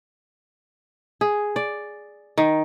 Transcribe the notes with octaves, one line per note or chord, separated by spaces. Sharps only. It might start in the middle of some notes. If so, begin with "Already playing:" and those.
G#4
D5
D#3